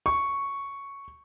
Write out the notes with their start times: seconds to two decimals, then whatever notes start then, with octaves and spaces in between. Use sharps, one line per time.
0.06 C#6